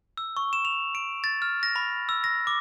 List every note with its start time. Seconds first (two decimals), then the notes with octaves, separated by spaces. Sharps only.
0.17 E6
0.37 C#6
0.53 E7
0.65 F7
0.95 D7
1.24 A6
1.42 F6
1.63 A#6
1.76 B5
2.09 E6
2.24 A#6
2.47 D6